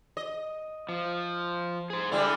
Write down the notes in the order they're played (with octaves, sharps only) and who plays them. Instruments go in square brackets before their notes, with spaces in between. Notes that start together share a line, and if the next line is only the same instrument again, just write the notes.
[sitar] D#5
[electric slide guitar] F3
G#4 C5
[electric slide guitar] D3 [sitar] G3 G#3 E4